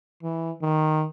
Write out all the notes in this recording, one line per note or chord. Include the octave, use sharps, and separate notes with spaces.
E3
D#3